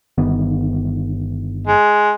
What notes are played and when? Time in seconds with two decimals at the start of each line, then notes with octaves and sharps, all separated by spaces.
0.18 G1 D#3 B3
1.67 G#3